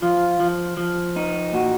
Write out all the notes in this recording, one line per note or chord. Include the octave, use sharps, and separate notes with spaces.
F3 F4
F3
F3
D#4
A#2 F#4